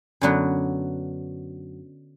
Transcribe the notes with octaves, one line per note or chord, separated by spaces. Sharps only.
F#2 D3 F#3 B3